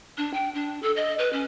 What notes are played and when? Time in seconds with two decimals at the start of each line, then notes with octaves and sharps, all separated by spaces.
0.18 D4
0.34 G5
0.55 D4
0.83 A4
0.96 D#5
1.19 B4
1.33 C#4